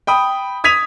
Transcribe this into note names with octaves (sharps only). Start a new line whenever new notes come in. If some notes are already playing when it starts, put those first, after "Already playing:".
G5 B5 D#6
D#6 G#6 B6 D#7 F7